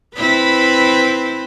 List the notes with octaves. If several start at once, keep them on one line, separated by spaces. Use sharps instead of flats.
C4 E4 B4